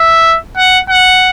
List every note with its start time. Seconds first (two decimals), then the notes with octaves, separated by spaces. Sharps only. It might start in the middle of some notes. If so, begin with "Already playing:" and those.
Already playing: E5
0.57 F#5
0.90 F#5